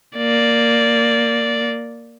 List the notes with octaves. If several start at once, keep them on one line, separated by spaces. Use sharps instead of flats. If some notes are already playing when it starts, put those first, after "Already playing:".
A#3 D5